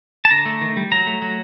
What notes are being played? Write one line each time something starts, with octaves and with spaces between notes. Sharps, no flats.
A5
D3 A#5
A3
D#3
G3
F#3 A#5
A3
F#3